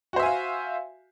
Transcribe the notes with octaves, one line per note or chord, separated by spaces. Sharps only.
F#4 C5 E5 F5 G#5